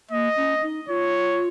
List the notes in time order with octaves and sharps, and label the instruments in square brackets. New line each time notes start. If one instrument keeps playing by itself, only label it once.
[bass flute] A#3 [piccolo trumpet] D#5
[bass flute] C#4
D#4
[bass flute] F4 [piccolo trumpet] C#5